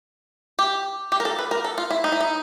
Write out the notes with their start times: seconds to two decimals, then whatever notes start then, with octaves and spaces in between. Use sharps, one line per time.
0.59 G4
1.12 G4
1.20 A#4
1.25 A4
1.38 B4
1.51 A#4
1.65 A4
1.78 F4
1.91 E4
2.04 D#4
2.12 E4
2.21 D#4